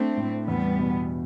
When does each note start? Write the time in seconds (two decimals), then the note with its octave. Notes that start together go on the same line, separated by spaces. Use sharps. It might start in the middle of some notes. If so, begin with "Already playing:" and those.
Already playing: A3 C4 D4
0.17 A2
0.47 E2 G3 B3
0.79 B2